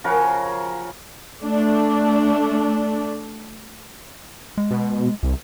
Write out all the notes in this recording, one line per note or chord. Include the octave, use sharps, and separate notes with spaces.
C#3 F3 F#4 A#4
A3 D4
G#3
B2
C2